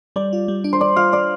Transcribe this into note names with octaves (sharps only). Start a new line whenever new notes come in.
G3 D5
F4
G3
D4
C5
D4 D5
F4 F5
F4 D5